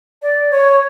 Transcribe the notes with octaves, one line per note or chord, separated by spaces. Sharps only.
D5
C#5